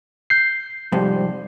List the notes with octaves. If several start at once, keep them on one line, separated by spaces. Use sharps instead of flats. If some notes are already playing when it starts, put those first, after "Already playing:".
G6 C7
F2 G#2 C3 G3